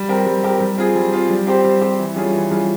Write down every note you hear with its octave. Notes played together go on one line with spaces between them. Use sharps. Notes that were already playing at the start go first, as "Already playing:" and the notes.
Already playing: G3
C4 G4 A#4
G3
C4 G4 A#4
G3
C4 F4 G#4
G3
C4 F4 G#4
G3
C4 G4 C5
G3
C4 G4 C5
E3
G3 C#4 F4 G#4
E3
G3 C#4 F4 G#4